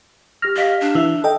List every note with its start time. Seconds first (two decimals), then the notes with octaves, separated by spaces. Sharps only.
0.42 G4 F6 A#6
0.56 G4 D#5 F5 B6
0.81 D4
0.95 E3 E5 E6
1.24 A4 D#5 G5